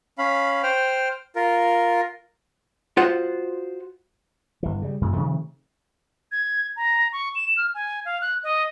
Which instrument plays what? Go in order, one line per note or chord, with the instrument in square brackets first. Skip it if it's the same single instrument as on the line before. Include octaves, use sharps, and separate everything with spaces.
[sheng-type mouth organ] C#4 F5 B5
C5 G5 F6
F4 A#4
[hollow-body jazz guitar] F4 F#4 C5 F#5
[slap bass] G1 E3
C#3 G3
F#2 A#2 C#3
C3 D#3 F3 A3
[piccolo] G#6
A#5
C#6
E7
F6
G#5
F5
F#6
D#5